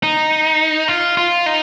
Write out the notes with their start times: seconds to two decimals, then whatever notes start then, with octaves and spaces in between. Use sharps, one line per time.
0.03 D#4
0.88 F4
1.17 F4
1.46 D#4